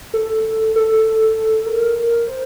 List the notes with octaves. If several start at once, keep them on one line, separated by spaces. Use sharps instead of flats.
A4
A4
A#4
C5